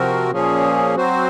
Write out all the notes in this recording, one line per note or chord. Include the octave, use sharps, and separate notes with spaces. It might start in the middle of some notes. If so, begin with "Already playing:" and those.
Already playing: C3 F3 C4 F#4 A#4
A#2 F3 A#3 C#4 G#4
F#3 C4 F#4 C5